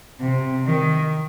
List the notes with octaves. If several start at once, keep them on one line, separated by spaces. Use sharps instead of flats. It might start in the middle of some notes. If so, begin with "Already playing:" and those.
C3
D#3